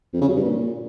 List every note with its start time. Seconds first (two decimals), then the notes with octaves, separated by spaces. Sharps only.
0.13 F2
0.21 C#3
0.28 F#3
0.36 G2
0.44 A#2